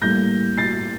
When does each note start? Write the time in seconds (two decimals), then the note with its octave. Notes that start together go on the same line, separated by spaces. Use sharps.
0.02 A2 G3 A#3 G6 A#6
0.57 A6 C7